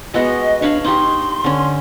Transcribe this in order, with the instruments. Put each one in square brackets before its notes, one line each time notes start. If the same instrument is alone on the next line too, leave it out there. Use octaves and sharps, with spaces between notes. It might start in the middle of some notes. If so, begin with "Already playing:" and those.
[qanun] G#3 B3 F#4 [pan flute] D#5
[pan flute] D4 [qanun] C#5 F5 B5
[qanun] D#4 G4 [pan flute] C6
[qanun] D3 C#4